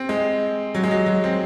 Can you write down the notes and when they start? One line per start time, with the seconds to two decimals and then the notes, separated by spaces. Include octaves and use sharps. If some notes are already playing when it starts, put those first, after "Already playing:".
Already playing: C4
0.09 G#3
0.74 F#3
0.84 G#3
0.91 F#3
1.06 F#3
1.24 C4